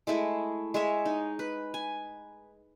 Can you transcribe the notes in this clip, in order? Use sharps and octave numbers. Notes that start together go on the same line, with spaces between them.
G#3 A3 E4 G#4
G#3 C#5 E5
D#4
B4
G#5